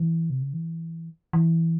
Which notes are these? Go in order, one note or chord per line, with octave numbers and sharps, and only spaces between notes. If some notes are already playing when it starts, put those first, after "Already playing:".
Already playing: E3
C3
C#3
E3
E3